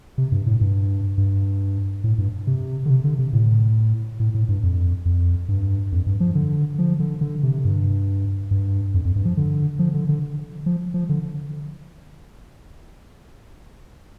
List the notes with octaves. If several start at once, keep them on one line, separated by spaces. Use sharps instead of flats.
C3
G2
A2
G2
G2
A2
G2
C3
D3
C3
D3
C3
A2
A2
A2
G2
F2
F2
G2
F2
G2
F3
D3
F3
D3
D3
C3
G2
G2
F2
F2
G2
F3
D3
F3
D3
D3
F3
F3
D3